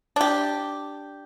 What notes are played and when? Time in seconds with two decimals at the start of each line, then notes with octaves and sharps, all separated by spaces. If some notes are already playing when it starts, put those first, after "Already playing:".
0.16 D4 G4